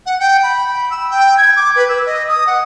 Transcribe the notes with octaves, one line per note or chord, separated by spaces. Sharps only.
F#5
G5
B5
E6
G5
G#6
D6
B4
E6
D#5
D#6
F#5